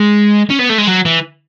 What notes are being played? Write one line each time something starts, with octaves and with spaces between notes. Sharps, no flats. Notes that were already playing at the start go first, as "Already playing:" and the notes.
Already playing: G#3
C#4
B3
A3
G#3
F#3
E3